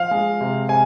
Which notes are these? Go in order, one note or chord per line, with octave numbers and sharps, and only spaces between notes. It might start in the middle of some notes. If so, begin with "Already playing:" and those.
Already playing: F3 F5
G#3
C3
C3 G#5